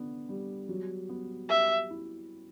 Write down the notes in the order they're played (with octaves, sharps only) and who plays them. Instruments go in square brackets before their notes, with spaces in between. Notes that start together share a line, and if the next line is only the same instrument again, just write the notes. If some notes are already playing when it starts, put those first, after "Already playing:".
Already playing: [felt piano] D3 B3
G3
F#3
B3
[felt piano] G4 [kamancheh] E5
[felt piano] E4